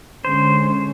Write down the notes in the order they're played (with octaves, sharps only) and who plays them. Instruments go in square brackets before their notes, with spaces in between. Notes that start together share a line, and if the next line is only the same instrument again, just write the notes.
[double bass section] D3 G#3 C#4 [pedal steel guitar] C5